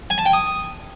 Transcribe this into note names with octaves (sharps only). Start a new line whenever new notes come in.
G#5
A5
G5
D#6